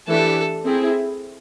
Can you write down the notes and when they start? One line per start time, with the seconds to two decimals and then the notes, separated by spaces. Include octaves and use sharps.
0.08 E3 A3 D4 G4 A4
0.64 C4 E4 G#4